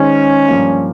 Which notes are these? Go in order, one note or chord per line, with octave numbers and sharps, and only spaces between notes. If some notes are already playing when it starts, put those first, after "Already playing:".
Already playing: D#3 G#3 C#4 D#4 G#4 C5
G2 F3 A#3